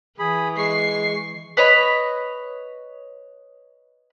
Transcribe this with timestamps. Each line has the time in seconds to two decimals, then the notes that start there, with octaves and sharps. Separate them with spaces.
0.19 E3 G#4 B5
0.58 G#3 C#6 C7
1.57 B4 C#5 D#5 B5